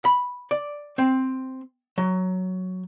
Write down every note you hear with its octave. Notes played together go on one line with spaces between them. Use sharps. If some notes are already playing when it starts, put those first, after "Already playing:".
B5
D5
C4
F#3